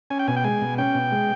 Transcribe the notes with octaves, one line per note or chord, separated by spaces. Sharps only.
C#4 G#5
G5
B2 G#5
G5
G#3 G#5
B2
C#4 G5
B2
G#3